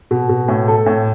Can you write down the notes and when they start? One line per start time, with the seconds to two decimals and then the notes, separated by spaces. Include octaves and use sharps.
0.11 B2
0.29 B2
0.48 A2
0.68 A4
0.86 A2